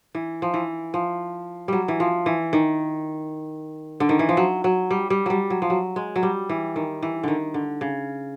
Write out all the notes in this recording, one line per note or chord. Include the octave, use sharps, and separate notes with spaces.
E3
F3
E3
F3
F#3 G3
E3
F3
E3
D#3
D3
D#3
E3
F3
F#3
F#3
G3
G3
F#3 G3
F#3
F3
F#3
G#3
F#3
G3
E3
D#3
E3
D3 D#3
D3
C#3